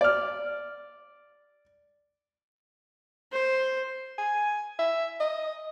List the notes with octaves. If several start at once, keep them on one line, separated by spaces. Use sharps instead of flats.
D5 F6
C5
G#5
E5
D#5